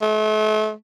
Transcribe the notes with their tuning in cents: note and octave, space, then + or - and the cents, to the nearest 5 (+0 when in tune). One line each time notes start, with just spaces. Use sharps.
A3 -40